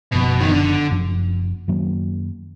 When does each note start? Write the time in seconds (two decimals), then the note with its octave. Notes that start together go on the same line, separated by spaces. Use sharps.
0.12 F#1 F#2 B2 F3
0.41 D#3
0.51 D3
0.90 F#1 F#2 F3
1.68 F#2 D#3 F#3 A#3